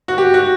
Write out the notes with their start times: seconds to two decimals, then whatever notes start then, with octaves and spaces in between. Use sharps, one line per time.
0.08 F#4
0.18 G4
0.34 F#4